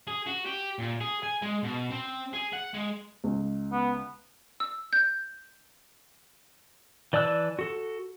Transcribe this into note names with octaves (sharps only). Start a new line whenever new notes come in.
G#4
F#4
G4
A#2
G#4
G#5
G#3
B2
C4
G#4
F#5
G#3
C#2
B3
E6
G6
E3 D5 A5 E6 F#6
F#4 A4